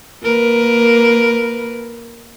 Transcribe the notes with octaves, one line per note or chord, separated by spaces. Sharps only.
A#3 A#4 B4